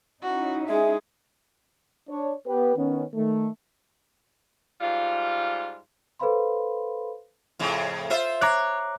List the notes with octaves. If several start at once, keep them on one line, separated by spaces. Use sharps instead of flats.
C#4 D#4 E4 F#4
G#3 G#4 E5
D4 C#5
B3 G4 B4
D#3 B3 C#4
D#3 A3
G#2 G3 F4
A4 B4 C5 F5 B5 C6
F2 A2 C#3
F4 C5 E5
C#5 A#5 D6 F#6